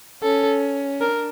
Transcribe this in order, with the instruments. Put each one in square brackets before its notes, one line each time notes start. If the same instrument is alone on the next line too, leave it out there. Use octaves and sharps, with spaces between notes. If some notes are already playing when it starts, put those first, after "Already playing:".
[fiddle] C#4 [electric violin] A4
[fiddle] D4 [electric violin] A#4